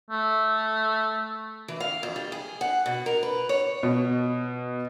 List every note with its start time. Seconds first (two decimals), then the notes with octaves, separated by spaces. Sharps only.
0.10 A3
1.68 E3
1.80 F5
2.03 F2
2.16 G3
2.32 G#4
2.61 F#5
2.86 B2
3.06 A#4
3.23 B4
3.49 C#5
3.83 B2